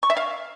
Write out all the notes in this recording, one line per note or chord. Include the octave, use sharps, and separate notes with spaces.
C#6
E5
F5